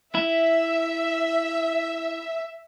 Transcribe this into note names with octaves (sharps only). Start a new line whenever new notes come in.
E4 E5